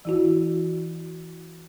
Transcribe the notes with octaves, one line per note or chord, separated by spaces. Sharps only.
E3 E4 F#4